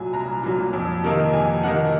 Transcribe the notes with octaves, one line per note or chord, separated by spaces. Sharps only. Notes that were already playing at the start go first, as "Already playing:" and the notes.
Already playing: C2 A#2 F#3 G#5
C2 A#5
A#2 F#3
F2
C3 D#3 A#3 D#4
F2 G#5
C3 D#3 A#3 D#4 F#5